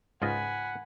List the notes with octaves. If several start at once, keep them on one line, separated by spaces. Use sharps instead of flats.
C#2 G#2 F4 D#5 F#5 G#5 B5